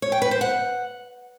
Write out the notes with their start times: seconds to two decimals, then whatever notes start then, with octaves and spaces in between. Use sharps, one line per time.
0.02 C#5
0.12 G5
0.22 B4
0.31 C5
0.41 F#5